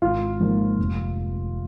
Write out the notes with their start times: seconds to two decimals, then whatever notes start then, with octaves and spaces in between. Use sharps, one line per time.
0.02 G#1 F4 F5
0.40 G#2 F3 A#3
0.78 F1